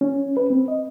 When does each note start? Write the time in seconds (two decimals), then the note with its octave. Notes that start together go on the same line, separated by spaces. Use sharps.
0.01 C#4
0.37 B4
0.50 C4
0.68 D#5